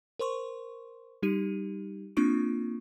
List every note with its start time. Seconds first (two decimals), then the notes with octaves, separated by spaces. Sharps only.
0.19 A#4 C5 C6 C#6
1.23 G3 D#4 G4 D#7
2.17 A#3 C4 D4 F4 C#6 D7